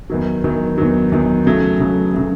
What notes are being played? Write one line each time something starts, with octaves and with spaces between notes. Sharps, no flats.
E2 D#3 F#3
E2 D#3 F#3
E2 D#3 F#3
E2 D#3 F#3
C#3 F#3 A3
C#3 F#3 A3
C#3 F#3 A3